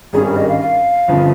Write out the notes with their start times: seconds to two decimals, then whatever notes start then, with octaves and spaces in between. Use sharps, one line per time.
0.13 G#1 G2 G3 C#4 G#4
0.26 A#4
0.37 D#5
0.48 F5
0.61 F5
1.08 G1 F2 C#3 F3